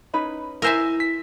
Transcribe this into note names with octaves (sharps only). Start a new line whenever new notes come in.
C#4 D#4 B4
E4 A#4 C5 E5 G#5 E6 A#6
B6